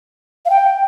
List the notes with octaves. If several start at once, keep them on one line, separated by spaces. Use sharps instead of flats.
F5
G5